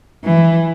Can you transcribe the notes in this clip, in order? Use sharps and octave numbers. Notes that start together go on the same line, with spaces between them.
E3